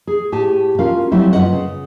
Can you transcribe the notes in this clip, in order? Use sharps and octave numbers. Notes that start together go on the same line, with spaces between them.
G#4
A2 G4 G#5 A5
C#4 F4 F#4 A#4 F5
F#3 G3 A3 C4 C#4 E4
F#2 F4 B4 D#5 F#5
C#3